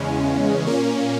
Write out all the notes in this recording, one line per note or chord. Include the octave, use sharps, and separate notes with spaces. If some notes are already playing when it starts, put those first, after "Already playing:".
Already playing: E2 C#3 G#3 C#4
A#2 A#3 C#4